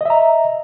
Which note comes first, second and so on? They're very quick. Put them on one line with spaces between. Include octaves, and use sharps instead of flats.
D#5 E5 A#5